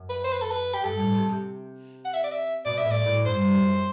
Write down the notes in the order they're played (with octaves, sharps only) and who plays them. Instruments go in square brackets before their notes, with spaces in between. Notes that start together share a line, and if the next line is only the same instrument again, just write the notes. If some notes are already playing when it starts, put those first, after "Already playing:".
Already playing: [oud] F#2
[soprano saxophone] B4
C5
B4
A4
B4
G4
[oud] G2 [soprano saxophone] A4
[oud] A2
C3
C3
[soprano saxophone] F#5
E5
D5
E5
[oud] B2 [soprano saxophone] D5
[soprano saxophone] E5
[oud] A2
[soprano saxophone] D5
[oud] A2
[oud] G2 [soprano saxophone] C5
[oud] F#2